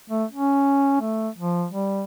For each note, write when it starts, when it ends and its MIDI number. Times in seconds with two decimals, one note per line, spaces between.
0.10 0.25 57
0.32 0.98 61
1.01 1.29 57
1.38 1.66 53
1.71 2.04 55